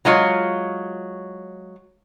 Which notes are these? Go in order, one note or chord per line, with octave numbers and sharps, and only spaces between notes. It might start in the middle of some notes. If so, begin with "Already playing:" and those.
F#3 G#3 F4 C#5